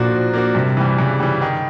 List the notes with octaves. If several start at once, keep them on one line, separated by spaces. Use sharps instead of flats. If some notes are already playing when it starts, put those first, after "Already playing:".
Already playing: A#2 F3 A#3 D4 F#4
F3
A#3 D4 F#4
G2 C3
E3 G3
G2 C#3
E3 G3
D#3